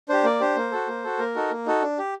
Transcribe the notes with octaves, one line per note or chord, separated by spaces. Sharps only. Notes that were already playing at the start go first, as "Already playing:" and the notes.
D4 G4 C5
A#3 D5
D4 G4 C5
A#3
F#4 A4
A#3
F#4 A4
A#3 A#4
D#4 F#4 A4
A#3
D#4 F#4 A4
D4
G4